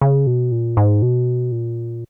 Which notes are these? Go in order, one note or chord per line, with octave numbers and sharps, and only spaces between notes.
C#3
B2
A#2
G#2
B2
A#2